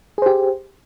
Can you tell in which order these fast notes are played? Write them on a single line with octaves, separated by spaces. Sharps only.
G#4 C5 G4